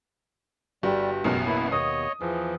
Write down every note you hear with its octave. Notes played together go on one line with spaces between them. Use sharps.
G1 G3 F#4 G4 A4
A1 F#2 B2 G#3 A#4
A#3 B3 E4
D#2 B2 C#5 D#5 D#6
E2 E3 F3